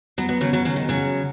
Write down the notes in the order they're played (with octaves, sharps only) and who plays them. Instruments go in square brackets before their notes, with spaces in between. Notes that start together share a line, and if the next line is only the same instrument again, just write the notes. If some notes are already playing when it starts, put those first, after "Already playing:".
[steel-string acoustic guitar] F#3 B3
F#3 B3
C#3 F#3
C#3 F#3
C#3 F#3
D#3
C#3 F#3